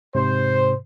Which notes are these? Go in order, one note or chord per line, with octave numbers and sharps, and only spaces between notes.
G#2 C3 C5